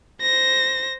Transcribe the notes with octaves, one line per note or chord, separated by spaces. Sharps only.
C5 A#6